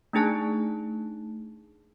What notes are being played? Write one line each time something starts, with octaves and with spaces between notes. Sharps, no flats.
A3 D4 D#4 G#4 A5 F#6